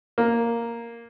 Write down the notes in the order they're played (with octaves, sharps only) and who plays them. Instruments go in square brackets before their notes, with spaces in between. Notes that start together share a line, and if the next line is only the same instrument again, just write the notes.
[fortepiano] A#3